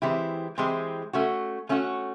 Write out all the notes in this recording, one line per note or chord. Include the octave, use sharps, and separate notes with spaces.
E3 G#3 C4 E4 G4
E3 G#3 C4 E4 G4
A3 C#4 F#4
A3 C#4 F#4